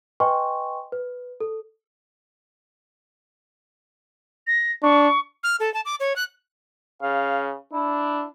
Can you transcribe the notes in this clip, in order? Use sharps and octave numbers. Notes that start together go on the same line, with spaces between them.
B4 D#5 G5 G#5 C6 C#6
B4
A4
A#6
D4 C#6
F6
A4
A5
D6
C#5
F#6
C#3 F5
D4 E4